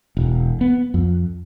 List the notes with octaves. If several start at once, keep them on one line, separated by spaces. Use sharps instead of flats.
E1
B3
F2